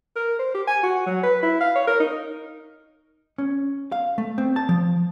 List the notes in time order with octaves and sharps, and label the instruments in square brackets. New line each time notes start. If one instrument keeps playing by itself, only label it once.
[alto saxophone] A#4
C5
G4
G#5
F#4
F#3
B4
E4
F5
C#5
A#4
D#4
[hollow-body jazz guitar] C#4
F5
A3
C4
A5
F3